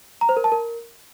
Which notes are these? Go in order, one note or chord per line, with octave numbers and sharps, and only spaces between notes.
A#5
C5
A#4
A5
A#4